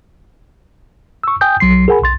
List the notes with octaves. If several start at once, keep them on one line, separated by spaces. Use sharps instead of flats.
C#6 E6
G5 G#5 D#6 G6
B1 F#3 C6 C7
G#4 A#4 F#5 G#5 B5
B1 C6 A6